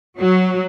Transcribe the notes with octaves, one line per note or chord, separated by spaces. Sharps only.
F#3